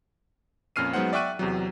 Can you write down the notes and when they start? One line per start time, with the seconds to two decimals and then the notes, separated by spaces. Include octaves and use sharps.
0.76 F2 A#2 C#4 F6 C7 D#7
0.93 F#3 G#3 B3 D#4 C5 F#5
1.13 D5 E5 G5 C#6 F#6 D#7
1.39 E2 C3 F#3